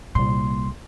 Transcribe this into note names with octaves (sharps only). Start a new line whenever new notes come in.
C2 A#2 C6